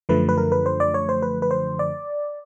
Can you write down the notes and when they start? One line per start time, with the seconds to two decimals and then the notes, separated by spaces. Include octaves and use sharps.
0.09 F#2 D3 F3 A3 B4
0.29 B4
0.38 A#4
0.52 B4
0.66 C5
0.80 D5
0.94 C#5
1.09 C5
1.22 B4
1.42 B4
1.51 C5
1.79 D5